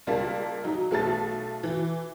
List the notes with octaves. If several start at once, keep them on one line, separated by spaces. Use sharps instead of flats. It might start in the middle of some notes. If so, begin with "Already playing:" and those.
C#2 G3 A#3 F5 A5
F#3 D#4
B1 A3 A4 A6
E3